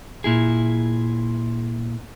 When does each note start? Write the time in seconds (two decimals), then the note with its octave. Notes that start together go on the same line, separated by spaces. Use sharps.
0.24 A#2 E4 G#4